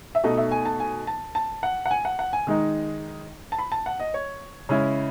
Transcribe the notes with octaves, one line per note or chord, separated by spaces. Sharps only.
E5
B2 A3 D#4 D#5
E5
G#5
A5
G#5
A5
A5
F#5
F#5
G#5
F#5
F#5
G#5
D#3 G#3 D#4
A5
B5
A5
F#5
D#5
C#5
C#3 G#3 C#4 E4